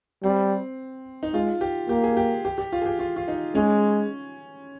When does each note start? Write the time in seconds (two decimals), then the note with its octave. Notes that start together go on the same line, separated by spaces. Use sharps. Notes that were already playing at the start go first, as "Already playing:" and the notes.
0.23 G3 C4
1.23 D#4
1.34 G#3 F4
1.61 G4
1.89 A#3 G4
2.04 G#4
2.17 G4
2.45 G4
2.58 G4
2.72 F4
2.82 G#4
2.86 G4
2.99 F4
3.16 F4
3.28 D#4
3.55 G#3 C#4